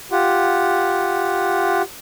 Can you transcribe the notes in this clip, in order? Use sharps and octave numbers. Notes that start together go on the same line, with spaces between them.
F4 G4 F#5